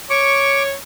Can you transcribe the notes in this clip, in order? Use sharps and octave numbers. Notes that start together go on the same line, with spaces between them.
C#5 C#6 D6